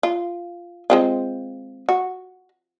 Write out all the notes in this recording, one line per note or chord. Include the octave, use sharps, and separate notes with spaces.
F4
G#3 C4 F4
F#4